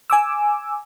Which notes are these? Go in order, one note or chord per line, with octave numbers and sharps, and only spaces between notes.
G#5 D6 E6